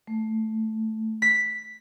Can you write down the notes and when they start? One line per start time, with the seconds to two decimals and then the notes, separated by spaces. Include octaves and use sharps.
0.07 A3
1.22 B6